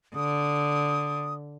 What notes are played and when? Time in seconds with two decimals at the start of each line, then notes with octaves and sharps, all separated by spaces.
0.15 D3 D#6